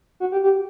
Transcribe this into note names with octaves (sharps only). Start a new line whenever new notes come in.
F#4
G4
G4